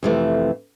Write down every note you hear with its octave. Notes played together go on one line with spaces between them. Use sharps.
F2 C3 E3 A3